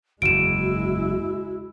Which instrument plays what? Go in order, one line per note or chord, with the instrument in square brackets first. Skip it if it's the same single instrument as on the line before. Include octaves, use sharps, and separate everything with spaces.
[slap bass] F#1 E2 [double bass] G#3 E4 [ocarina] F#4 [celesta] D7 E7